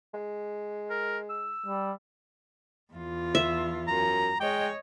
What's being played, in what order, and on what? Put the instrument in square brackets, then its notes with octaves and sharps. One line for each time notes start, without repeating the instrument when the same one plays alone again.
[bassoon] G#3
[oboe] A#4
E6
[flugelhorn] G3
[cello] E2 F4
[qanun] E5
[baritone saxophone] F#2 [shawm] A#5
[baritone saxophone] G#3 [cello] C#5 D#5 [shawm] G5